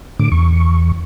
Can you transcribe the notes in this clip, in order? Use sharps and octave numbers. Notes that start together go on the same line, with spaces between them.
A2 D3 D6
E2 C#6